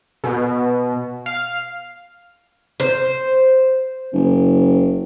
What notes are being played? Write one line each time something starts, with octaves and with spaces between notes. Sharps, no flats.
B2
F5
C5
F#1